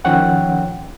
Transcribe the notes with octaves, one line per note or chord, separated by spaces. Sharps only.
D#3 F3 C#4 C#5 F#5 G5